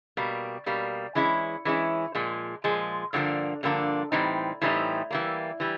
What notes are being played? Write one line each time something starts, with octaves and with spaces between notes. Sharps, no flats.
B2 G3 A#3
B2 G3 A#3
E3 G#3 C#4 E4
E3 G#3 C#4 E4
A#2 F3 G#3
A#2 F3 G#3
G2 D3 F3 A#3 D4
G2 D3 F3 A#3 D4
A2 E3 G3 C4 D#4
A2 E3 G3 C4 D#4
E3 G3 A#3
E3 G3